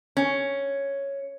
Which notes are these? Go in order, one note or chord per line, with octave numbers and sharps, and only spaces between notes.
C#4